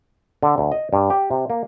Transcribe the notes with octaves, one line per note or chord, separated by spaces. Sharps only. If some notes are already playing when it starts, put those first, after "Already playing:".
D3
D2
D#5
G2
G4
C3
A#3